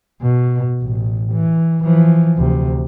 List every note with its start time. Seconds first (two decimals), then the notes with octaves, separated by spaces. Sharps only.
0.22 B2
0.82 A1
1.33 E3
1.84 E3 F3
2.37 D2 C3